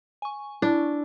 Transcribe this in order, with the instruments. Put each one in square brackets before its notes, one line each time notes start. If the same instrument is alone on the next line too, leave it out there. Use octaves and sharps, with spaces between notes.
[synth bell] G#5 C#6
[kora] D4 [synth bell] E4